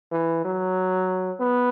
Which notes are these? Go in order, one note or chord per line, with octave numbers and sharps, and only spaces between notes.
E3
F#3
B3